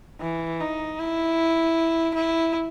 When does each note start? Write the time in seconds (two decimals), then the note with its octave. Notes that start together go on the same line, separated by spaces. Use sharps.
0.21 E3
0.60 D#4
0.99 E4
2.14 E4